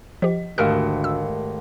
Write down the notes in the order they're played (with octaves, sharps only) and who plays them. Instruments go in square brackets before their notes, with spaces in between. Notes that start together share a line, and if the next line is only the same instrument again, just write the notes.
[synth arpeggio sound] F3 G4 [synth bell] D#5
[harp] G#1 A3 D7 [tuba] D2 [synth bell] G4 A#4 F5 [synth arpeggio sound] F6
[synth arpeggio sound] E6